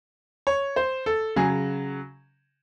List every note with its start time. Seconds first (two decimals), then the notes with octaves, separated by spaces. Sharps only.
0.47 C#5
0.76 C5
1.06 A4
1.36 C#3 F#3 G#4